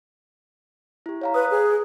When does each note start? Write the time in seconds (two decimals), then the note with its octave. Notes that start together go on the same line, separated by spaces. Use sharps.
1.06 E4 G4
1.21 C#5 F5 A#5
1.34 B4 D#6 F#6
1.51 G#4